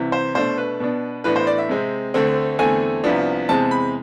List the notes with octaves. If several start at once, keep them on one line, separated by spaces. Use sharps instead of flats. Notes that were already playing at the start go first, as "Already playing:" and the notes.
Already playing: C2 C3 E3
C5
B2 A3 D4 C5
B4
B2 B3 D4
A2 E3 B3 D4 B4
C5
D5
E5
C3 G#3 C4
D2 D3 A3 C4
E2 D3 A3 C4 G#5
C2 C3 F3 B3 D4
E2 C3 G#3 C4 A5
B5